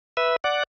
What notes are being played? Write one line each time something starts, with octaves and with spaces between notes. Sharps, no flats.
B4 E5
D5 F#5